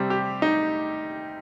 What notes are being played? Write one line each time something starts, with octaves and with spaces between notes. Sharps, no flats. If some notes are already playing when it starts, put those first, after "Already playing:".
Already playing: C3 G3 C4
G4
D#4